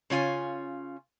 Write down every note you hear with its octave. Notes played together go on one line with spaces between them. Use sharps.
C#3 C#4 F4 G#5